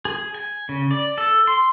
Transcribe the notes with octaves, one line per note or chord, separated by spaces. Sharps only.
G#4
G#5
C#3
D5
A4
C6